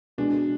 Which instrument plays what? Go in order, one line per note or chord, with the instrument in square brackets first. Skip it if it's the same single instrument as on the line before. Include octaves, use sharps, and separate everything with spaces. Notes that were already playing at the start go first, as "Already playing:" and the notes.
[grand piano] B2 G#3 D4